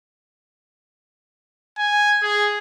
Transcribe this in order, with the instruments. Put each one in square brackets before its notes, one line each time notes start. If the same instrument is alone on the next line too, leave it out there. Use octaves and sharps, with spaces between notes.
[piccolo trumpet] G#5
G#4